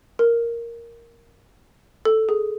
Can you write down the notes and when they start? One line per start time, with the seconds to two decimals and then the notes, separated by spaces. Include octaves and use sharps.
0.19 A#4
2.05 A4
2.29 G#4